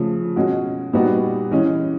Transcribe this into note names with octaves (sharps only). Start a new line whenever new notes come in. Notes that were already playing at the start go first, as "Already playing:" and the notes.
Already playing: C#3 F3 A3
B2 G#3 C#4 F#4
A#2 G3 B3 D#4 F#4
E3 G#3 C#4